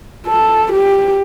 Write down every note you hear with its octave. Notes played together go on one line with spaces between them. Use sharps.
A4
G4